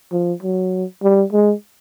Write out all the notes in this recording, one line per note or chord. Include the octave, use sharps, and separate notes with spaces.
F3
F#3
G3
G#3